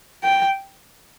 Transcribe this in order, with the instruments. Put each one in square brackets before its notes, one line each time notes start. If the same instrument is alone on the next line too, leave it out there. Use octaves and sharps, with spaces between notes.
[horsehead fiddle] G5